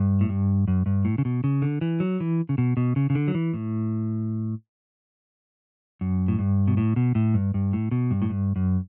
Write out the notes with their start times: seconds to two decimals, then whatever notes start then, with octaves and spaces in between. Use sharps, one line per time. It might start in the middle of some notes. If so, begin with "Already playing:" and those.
Already playing: G2
0.21 A2
0.29 G2
0.68 F#2
0.86 G2
1.05 A2
1.18 C#3
1.25 B2
1.44 C#3
1.62 D3
1.81 E3
2.00 F#3
2.20 E3
2.49 C#3
2.58 B2
2.77 B2
2.96 C#3
3.10 C#3
3.15 D3
3.28 F#3
3.35 E3
3.54 A2
6.01 F#2
6.28 A2
6.39 G2
6.68 B2
6.77 A2
6.96 B2
7.15 A2
7.34 G2
7.54 G2
7.73 A2
7.91 B2
8.11 G2
8.22 A2
8.29 G2
8.56 F#2